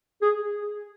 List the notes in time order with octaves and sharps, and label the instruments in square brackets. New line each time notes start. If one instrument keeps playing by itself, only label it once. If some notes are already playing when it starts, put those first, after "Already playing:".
[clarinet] G#4